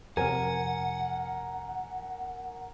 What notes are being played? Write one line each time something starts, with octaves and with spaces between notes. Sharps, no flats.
F2 C3 A#4 F#5 G#5